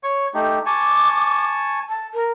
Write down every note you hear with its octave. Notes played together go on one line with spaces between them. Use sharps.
C#5 C#6
A3 D#4 G4
G#5 A5 C#6 D6
A5
A#4